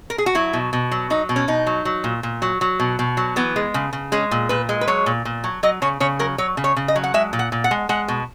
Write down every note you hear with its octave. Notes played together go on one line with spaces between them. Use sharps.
A#4
G#4
F#4
F#3 E4
B2
B2
F#3
F#3 D#4
B2
C#4
B2 D#4
F#3
F#3
A#2
A#2
F#3
F#3
B2
B2
F#3
E3 B3
G#3
C#3
C#3
G#3 C#4
A#2
A#2 B4
G#3
B4
F#3 C#5
A#2
A#2
F#3
F#3 D#5
C#3 C#5
C#3 C#5
F#3 A#4
F#3 C#5
C#3
C#5
C#3
D#5
F#3
F#5
G#3 E5
A#2
F#5
A#2
F#5
G#3
G#3 F#5
B2